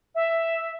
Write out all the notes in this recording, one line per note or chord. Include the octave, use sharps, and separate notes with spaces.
E5